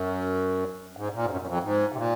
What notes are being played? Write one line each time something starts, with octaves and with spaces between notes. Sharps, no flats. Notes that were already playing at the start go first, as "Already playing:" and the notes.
Already playing: F#2
G#2
A#2
G#2
F#2
F#2
F2
G#2
C3
A#2